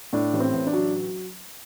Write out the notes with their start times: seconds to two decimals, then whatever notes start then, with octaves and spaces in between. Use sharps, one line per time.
0.13 A2 D4
0.33 A1
0.40 C4
0.54 A1
0.67 D4
0.73 F#3